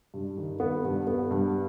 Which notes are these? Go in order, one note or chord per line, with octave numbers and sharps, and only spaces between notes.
G2
D#3
B3
G2
B3
G2